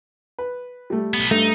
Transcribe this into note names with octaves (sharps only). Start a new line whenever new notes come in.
B4
G3 A3
B1 B3
G2 A3 D#4